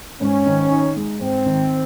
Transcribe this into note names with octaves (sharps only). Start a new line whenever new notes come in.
G#2 C#4
D#3
D#4
G#3
G#2 C4
D#3